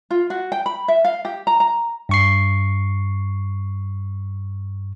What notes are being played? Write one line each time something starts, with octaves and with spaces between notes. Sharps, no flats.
F4
F#4
G5
B5
E5
F5
G4
A#5
A#5
G2 C#6 C7